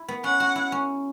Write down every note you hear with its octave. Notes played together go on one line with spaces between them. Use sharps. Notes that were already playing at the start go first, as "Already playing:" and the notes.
Already playing: E4
B3
C#4 F#5
F#4
E4
C#4